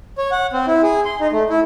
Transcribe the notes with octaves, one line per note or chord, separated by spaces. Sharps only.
C#5
F#5
C4
E4
G#4
C6
D#4
A3
E4